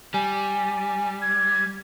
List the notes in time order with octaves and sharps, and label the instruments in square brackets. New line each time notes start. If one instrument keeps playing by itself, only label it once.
[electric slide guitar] G3 [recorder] G#5
[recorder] G#6